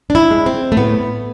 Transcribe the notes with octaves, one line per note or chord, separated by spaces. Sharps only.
D4
E4
G#3
C4
A3
A2 B3